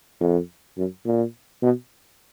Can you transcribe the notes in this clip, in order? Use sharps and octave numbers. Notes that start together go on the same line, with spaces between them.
F2
F#2
A#2
B2